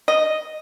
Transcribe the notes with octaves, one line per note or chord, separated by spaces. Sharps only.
D#5